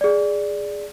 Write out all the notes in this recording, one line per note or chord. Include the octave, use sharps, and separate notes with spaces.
G#4 D5